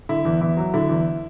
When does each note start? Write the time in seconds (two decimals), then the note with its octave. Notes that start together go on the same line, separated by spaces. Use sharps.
0.09 D3 E4
0.25 E2
0.41 E2 E4
0.57 F#3
0.74 D3 E4
0.89 E2